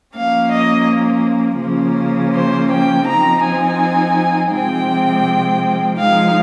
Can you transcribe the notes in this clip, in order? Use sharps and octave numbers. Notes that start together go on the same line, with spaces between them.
F3 A#3 C#4 F5
D#5
C#3 F3 A#3 C#4
C5
G5
F3 C4 D#4 A#5
G#5
C3 F3 G#3 C4 G5
F3 G#3 D#4 F5